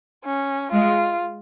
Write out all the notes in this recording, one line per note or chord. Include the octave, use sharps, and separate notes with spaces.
C#4
G#3 F4